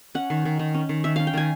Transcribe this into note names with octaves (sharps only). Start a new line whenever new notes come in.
C#4 F#5
D#3
D#3
D#3
C#4
D#3
D#3 E5
C#4 F5
G5
D#3 G#5